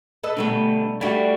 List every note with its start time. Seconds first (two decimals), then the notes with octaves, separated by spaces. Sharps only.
0.23 A4 B4 D#5
0.37 B2 D3 G3 A3 B3
1.01 G3 A3 D4 F#4 G4